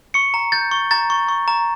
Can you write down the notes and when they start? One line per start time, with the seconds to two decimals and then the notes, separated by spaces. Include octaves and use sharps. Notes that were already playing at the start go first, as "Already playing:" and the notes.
0.14 C#6 C#7
0.34 A#5
0.52 G6 A6
0.71 C#6
0.91 A#5 A6
1.10 C#6
1.29 C#6
1.48 A#5